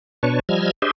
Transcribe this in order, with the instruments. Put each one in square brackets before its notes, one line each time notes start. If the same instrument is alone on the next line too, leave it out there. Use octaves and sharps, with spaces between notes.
[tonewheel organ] B2 D4 B4 C#5 A5 C#6
F3 G3 D#5 E6 F6 G#6
D4 G4 G#4 C5 D#5 E5